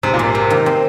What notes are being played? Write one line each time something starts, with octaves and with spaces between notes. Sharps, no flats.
G#2 C3
A#2
C3 A#3
C3 A#3
D#3
C4